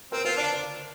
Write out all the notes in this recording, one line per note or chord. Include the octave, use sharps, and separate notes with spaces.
C4 A#4
F4 C5
D4 D5